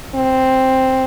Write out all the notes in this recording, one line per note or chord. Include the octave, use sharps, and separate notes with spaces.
C4